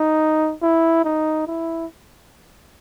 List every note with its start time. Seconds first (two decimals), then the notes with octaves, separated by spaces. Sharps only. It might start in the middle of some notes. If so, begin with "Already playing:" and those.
Already playing: D#4
0.62 E4
1.05 D#4
1.47 E4